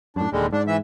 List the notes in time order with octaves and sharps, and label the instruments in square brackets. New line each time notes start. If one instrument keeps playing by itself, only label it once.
[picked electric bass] F#2 A2 [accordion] D4
[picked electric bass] D#1 D#2 [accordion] D3 G3 G#3
[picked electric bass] G#2 [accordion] D4
[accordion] E3 E5